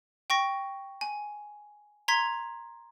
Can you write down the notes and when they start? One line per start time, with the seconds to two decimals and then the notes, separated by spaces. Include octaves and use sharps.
0.30 G5 C#6 A#6
1.01 G#5
2.08 A#5 C6 G#6 B6 F7